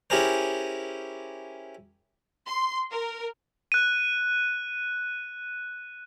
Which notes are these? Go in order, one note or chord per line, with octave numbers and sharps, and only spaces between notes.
C#4 E4 G4 G#4 A#4 C5
C6
A#4
F#6 D#7